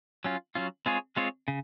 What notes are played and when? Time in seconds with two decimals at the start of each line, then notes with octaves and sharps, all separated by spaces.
0.24 F#3 C#4 F4
0.55 F#3 C#4 F4
0.86 G#3 C4 F4 G#4 C#5
1.17 G#3 C4 F4 G#4 C#5
1.48 C#3